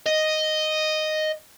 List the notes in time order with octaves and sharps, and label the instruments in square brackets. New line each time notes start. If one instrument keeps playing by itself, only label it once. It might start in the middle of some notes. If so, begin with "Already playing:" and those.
[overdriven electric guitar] D#5